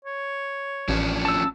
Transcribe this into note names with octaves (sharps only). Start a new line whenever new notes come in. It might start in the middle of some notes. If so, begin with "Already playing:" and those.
C#5
A1 F3 C#4 D4
A5 E6